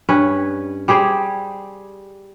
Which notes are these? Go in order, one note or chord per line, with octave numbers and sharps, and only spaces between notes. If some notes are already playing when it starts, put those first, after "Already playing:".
G2 C#4 B4
G3 G4 G#4 C5